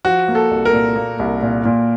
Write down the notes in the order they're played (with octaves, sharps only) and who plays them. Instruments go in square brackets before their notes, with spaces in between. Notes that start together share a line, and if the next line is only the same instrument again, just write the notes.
[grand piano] F3 [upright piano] F#4
[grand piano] A#3
[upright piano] A4
[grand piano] C2
[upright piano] A#4
[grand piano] A#2
A#3
C2
A#2
A#2